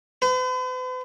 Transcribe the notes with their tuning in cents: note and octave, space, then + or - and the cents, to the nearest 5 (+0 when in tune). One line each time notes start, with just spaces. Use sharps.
B4 +45